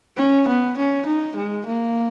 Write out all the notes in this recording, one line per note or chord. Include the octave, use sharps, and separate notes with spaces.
C#4
B3
C#4
D#4
G#3
A#3